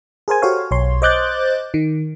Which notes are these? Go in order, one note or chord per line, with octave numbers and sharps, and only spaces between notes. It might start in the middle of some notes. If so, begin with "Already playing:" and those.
G#4 A#4 C5 G#5
F#4 G4 A4 C5 C#5 F5
B1 C#5 C6
C5 D#5 D6 F#6 G6 A6
D#3